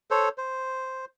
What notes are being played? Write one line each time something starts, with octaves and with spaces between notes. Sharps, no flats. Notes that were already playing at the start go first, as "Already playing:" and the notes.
A4 C5 C#5
C5